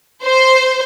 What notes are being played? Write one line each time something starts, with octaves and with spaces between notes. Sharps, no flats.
C5